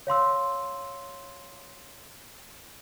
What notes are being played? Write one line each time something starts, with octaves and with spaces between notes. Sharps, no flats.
C#5 F5 C6 E6